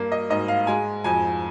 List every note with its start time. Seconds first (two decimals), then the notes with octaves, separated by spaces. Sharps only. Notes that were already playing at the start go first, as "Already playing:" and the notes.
Already playing: G2 A#3
0.12 D#5
0.30 G#2 D#5
0.48 F5
0.67 G#3 G#5
1.04 F2 G#5